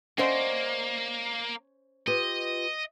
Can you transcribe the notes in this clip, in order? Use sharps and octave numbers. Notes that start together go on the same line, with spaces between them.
A#3 C#4 C5 D5 D#5 F#5
F4 G4 B4 D#5